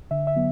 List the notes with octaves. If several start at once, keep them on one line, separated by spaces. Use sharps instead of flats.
D3 E5
E5
F#3 B3